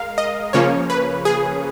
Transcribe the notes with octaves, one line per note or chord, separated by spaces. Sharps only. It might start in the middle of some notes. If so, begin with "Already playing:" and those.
Already playing: G#3 A#4 F5
D#5
C#3 F3 A#3 C#4 C#5
B4
G#4